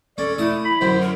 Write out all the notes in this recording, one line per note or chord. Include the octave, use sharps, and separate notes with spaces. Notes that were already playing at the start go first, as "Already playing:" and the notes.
C#4 A4 D5
A3 E4 A5 D#6
B5
F#2 D3 C5
A#4